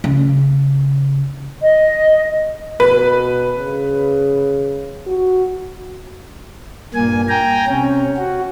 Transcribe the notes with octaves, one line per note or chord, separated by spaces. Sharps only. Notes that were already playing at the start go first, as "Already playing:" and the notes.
C#3
D#5
B2 B4
C#3
F#4
G2 A#2 A#3 G#5
G5 G#5 A#5
C3 C#4
F#4